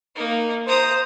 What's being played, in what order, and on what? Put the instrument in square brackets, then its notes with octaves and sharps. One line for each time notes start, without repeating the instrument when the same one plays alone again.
[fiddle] A#3 D#4
[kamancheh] C5 [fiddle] A#5 D#6